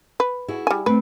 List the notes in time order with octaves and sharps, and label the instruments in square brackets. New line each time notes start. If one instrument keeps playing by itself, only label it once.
[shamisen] B4
[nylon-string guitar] E4 F#4 G#4
[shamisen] G3 G#5
[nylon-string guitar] A3 C4 [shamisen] B4